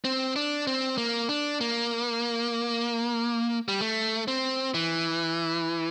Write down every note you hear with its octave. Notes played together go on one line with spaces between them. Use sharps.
C4
D4
C4
A#3
D4
A#3
G3
A3
C4
E3